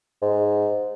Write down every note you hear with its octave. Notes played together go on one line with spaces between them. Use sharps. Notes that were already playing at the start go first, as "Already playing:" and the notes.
G#2